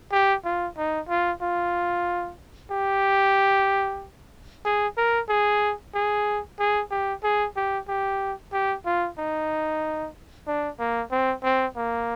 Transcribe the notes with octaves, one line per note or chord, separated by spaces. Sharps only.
G4
F4
D#4
F4
F4
G4
G#4
A#4
G#4
G#4
G#4
G4
G#4
G4
G4
G4
F4
D#4
D4
A#3
C4
C4
A#3